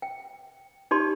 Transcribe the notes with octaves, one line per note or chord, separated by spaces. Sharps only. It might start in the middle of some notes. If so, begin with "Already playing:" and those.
G5
D#4 G4 D5 A5 C6